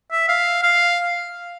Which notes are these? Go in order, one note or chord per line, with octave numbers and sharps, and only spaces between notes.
E5
F5
F5